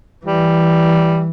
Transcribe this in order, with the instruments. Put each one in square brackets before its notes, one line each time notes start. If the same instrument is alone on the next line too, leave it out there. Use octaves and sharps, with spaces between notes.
[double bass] E3 [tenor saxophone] G3